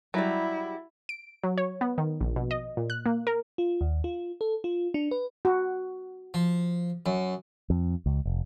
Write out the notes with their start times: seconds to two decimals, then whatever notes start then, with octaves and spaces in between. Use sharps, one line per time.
0.14 F#3 G3 E4
1.09 D7
1.43 F#3
1.58 C#5
1.81 B3
1.98 D#3
2.21 A#1
2.36 B2
2.51 D#5
2.77 A#2
2.90 F#6
3.06 A#3
3.27 A#4
3.58 F4
3.81 D#2
4.04 F4
4.41 A4
4.64 F4
4.94 D4
5.11 B4
5.45 F#4
6.34 F3
7.06 F#2
7.70 F2
8.06 C#2
8.25 F1